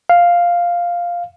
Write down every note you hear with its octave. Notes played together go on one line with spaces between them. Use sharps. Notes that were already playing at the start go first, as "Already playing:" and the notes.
F5